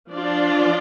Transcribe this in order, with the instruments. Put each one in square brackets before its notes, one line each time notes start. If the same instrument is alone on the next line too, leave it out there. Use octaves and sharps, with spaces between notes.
[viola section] F3 D4 F4 D5